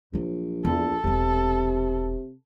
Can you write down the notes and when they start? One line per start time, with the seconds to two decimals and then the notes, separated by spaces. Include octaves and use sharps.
0.13 A#1 F3 F#3
0.65 E2 A4
1.04 E1 C3 C4